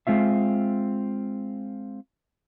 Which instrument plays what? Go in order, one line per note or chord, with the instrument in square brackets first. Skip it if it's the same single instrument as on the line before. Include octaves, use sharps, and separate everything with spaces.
[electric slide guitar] G#3 C4 F4 E5